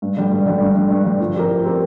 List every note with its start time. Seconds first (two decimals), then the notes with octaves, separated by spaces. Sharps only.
0.02 G2
0.17 D3 G3
0.31 G2
0.46 D3 G3
0.61 G2
0.75 D3 G3
0.91 G2
1.05 D3 G3
1.20 F3
1.35 C4 G4 A#4
1.49 F3
1.64 C4 G4 A#4